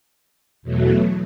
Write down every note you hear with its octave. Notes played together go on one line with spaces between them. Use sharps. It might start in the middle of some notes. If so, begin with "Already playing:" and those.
E2 B2 F#3 A3